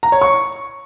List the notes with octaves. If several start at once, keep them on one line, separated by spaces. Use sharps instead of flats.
A#5
C#5
C#6